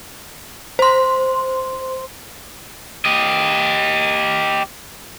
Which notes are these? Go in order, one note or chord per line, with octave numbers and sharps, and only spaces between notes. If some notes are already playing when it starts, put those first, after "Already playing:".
C5 C6
G4 D#5